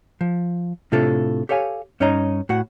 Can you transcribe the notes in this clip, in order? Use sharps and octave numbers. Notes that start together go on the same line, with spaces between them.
F3
A2 C3 D4 F4 A4
G4 A4 C#5 F5 G#5
G2 C#4 D#4 C#5 D#5 A#5
A2 F#4 F#5